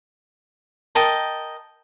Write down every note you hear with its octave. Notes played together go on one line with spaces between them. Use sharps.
A#4 D#5 G5 A5